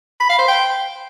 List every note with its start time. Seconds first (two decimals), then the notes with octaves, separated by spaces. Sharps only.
0.20 B5
0.29 F5
0.39 C5
0.48 G5